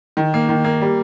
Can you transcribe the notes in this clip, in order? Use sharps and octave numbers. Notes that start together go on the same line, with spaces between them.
D#3
A#3
D#3
A#3
G3